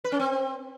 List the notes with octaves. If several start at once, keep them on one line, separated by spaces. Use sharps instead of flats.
B4
C#4
C4